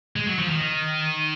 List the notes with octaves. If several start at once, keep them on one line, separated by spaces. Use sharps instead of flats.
G#3
F#3
F3
D#3